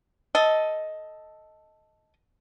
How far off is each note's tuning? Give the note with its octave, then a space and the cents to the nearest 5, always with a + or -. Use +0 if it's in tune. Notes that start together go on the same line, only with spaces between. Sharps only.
A4 +0 D#5 +10